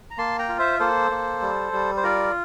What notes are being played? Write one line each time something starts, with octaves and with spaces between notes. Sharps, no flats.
A#5
A#3 A5 C6
G5 A#5
F4
C5 E5
A#3 A4 C5
A#3
G3
G3
C5
F4 A#4 D5